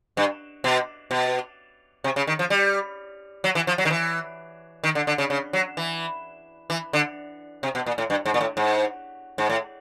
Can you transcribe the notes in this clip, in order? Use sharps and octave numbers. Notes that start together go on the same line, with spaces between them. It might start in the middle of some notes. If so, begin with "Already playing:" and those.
G2
B2
B2
C3
C#3
D#3
F3
G3
F#3
E3
F3
F#3
D#3
E3
D#3
D3
D3
C#3
C#3
F#3
E3
E3
D3
C3
B2
A#2
A2
G2
G#2
A#2
A2
G#2
G#2
A2